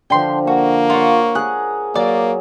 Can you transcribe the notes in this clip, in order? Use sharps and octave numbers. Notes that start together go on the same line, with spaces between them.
D3 F3 G5 C6
A#3 F#4
F4 C#5 F#5
G#4 A#4 F#6
F#3 A#3 D5